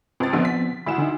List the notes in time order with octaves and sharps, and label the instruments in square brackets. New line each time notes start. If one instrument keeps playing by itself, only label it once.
[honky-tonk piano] C#2 A6 [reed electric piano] C4
[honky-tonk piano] A#1 D3 [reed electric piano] F3 B3 C4
[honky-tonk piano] B6
[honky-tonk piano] D2 E4 E7 [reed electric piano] F#5 B5
[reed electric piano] D3 D#4